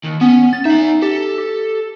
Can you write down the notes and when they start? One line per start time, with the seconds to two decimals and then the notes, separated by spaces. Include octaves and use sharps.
0.04 D#2
0.21 B3 C#4 G#5
0.53 A6
0.65 D#4 E5 F#5
1.02 G4 A4
1.38 G4